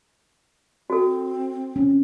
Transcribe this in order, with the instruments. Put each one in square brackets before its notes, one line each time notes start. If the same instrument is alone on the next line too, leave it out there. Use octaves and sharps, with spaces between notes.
[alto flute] C4 [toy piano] F#4 A4
[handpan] C#4